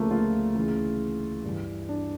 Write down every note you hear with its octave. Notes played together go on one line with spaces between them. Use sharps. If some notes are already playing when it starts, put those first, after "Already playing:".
Already playing: D2 C#3 F3 A3 A#3
F4
D2 C#3 E3
G2 E3
D4